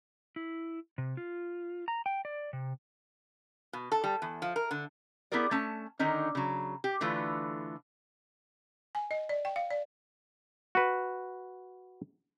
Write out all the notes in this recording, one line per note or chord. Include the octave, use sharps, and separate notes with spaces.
E4
C3
F4
A#5
G5
D5
C3
B2
A4
G3
E2
F3
A#4
D3
B3 E4 G4 G#4 A#4 D5
A3 C#4 A5
D3 D#3 C#4 D#4
C#3 F#3
G4
D3 E3 A3 F4 B4
G#5
D#5
D5
G5
F5
D5
F#4 B4